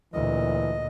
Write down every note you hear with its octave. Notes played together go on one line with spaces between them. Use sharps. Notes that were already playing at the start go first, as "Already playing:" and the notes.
D2 A#2 E3 D#5